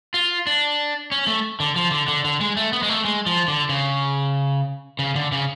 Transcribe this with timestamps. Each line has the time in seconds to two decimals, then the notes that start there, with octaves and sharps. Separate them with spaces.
0.14 F4
0.47 D4
1.11 C#4
1.27 A3
1.60 D3
1.76 F3
1.91 D3
2.08 D3
2.24 D3
2.41 G#3
2.57 A3
2.73 B3
2.83 G#3
2.89 A3
3.05 G#3
3.26 F3
3.48 D3
3.69 C#3
4.99 C#3
5.16 D3
5.32 C#3